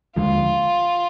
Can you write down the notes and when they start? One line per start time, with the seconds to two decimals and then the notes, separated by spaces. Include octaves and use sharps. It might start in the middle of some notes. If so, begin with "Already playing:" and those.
0.16 D#2 D3 F3 G#3 F4